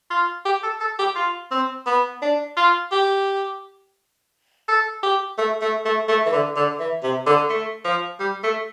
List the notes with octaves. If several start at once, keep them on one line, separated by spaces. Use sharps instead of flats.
F4
G4
A4
A4
G4
F4
C4
B3
D4
F4
G4
A4
G4
A3
A3
A3
A3
E3
D3
D3
E3
C3
D3
A3
F3
G3
A3